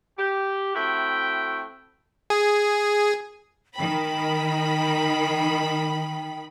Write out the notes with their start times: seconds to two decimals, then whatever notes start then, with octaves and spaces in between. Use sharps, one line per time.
0.18 G4
0.75 A3 C4 E4 F#4 G5
2.30 G#4
3.76 D#3 G5 B5